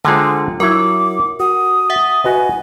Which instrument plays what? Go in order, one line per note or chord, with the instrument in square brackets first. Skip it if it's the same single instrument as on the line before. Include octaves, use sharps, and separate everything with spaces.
[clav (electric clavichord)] D3 G#3 C5 [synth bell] D4 F4 [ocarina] G#5
[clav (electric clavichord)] F#3 E4 [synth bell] A#4 [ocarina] D6
[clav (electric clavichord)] F#4 [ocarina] D#6
[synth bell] E5 F#5
[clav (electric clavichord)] F#4 B4 D#5 [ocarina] G#5